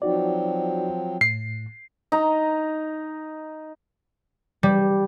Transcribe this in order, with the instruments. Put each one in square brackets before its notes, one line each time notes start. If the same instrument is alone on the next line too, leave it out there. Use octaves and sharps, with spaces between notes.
[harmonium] F3 F#3 C4 [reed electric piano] D#4 F#4 D5
[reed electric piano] A2 [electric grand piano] C7
[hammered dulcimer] D#4 A#5
[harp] G3